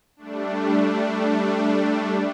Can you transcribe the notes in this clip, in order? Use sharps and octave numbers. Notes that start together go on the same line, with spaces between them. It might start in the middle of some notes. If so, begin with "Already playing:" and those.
G3 A3 D4